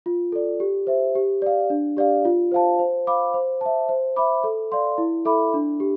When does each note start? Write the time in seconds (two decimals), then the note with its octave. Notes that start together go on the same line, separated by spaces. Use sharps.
0.06 F4
0.32 A4 D5
0.60 G4
0.87 C5 E5
1.15 G4
1.42 D5 F5
1.70 D4
1.97 G4 D5 F5
2.25 F4
2.52 C5 F5 A5
2.79 C5
3.07 F5 B5 D6
3.34 C5
3.61 E5 A5
3.89 C5
4.16 E5 B5 D6
4.44 A4
4.72 D5 F5 C6
4.98 E4
5.25 A4 E5 B5 D6
5.54 D4
5.80 G4